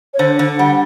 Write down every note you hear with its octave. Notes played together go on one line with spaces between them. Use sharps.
C#5
D3 C5
D3
G3 F#5